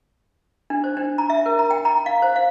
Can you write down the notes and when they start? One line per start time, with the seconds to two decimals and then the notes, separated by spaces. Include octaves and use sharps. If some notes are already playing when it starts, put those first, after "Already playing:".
0.70 D4
0.84 C5
0.97 D4
1.18 A#5
1.30 E5
1.46 A#4
1.59 A#5
1.70 G5
1.85 A#5
2.06 F5
2.22 C5
2.36 F5